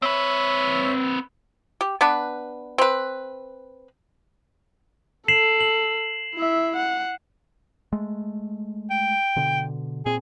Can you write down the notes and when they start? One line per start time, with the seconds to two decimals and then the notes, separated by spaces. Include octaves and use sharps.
0.02 C4 B4 C#5 E5
1.81 G4
2.01 B3 D4 B4
2.78 C4 B4
5.28 A4 C7 E7 F#7
5.61 F#7
6.35 E4 E5
6.77 F#5
7.93 G#3 A3
8.90 G5
9.36 B2 D3
10.06 A#2 C4 G#4